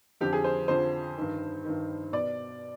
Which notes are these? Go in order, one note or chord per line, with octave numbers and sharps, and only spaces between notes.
F2 D3 F3 G4
G#4
C5
F2 D3 F3 C5
G2 D#3
G2 D#3
B2 D5